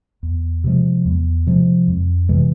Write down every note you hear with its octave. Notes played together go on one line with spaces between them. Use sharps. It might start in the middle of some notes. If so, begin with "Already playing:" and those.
E2
C3 F3 G#3
E2
C3 F3 G#3
F2
C3 E3 G#3